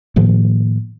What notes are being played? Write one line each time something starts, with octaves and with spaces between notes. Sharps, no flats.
A2 D#3 F3 A#3